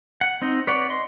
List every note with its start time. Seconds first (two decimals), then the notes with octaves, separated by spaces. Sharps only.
0.21 F#5
0.42 C4 D#4 D#5
0.67 B4 C#5 D5 F#5
0.89 D#5 C6